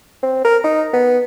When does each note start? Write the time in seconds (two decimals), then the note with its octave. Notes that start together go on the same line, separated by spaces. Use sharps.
0.23 C4
0.44 A#4
0.64 D#4
0.93 B3